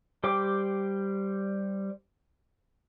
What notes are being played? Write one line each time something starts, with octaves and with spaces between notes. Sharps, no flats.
G3 G4 C5 G5 D6